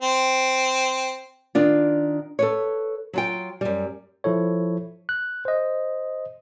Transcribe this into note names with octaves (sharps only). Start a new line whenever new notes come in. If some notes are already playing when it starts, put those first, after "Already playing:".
C4
D#3 D4 F4
A4 B4 C#5
F#3 F4 G5
F#2 G3
F3 E4 A4 C#5
F#6
C5 D#5